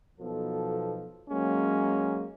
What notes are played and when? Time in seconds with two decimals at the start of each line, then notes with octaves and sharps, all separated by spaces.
0.19 B1 B2 F3 A4
1.30 F#3 G#3 A#3 C#4